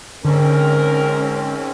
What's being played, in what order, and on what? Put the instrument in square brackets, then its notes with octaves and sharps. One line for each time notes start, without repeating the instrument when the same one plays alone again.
[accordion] G#2 C4 C#4 [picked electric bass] D3 [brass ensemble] A#4